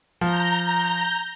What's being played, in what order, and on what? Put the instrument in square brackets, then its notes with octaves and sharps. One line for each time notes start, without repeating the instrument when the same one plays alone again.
[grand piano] F3 [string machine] A#5 G6